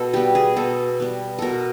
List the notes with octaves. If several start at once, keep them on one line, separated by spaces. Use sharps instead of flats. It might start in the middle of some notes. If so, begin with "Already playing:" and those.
Already playing: B2 A4
G3 B3 G4
G#4
B2 A4
G3 B3
B2 A4 A#4